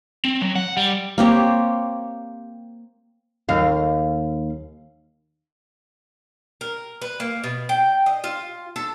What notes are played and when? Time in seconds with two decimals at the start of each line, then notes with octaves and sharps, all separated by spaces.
0.25 C4
0.41 F#3
0.55 F#5
0.77 G3
1.18 A#3 C4 G4 C#5
3.49 D#2 F5
6.61 A#4
7.02 B4
7.20 A#3
7.44 B2
7.69 G5
8.06 D#5
8.24 F4
8.76 A4